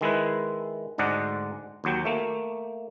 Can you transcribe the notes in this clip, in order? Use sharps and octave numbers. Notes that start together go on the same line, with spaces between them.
D#3 G#3 E4 B4
D2 G#2 G#3 D5 F#5 A#5
D#2 F#3 G5
A3 A#3